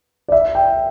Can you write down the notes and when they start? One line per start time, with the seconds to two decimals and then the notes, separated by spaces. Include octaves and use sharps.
0.28 D5
0.32 E5
0.55 G5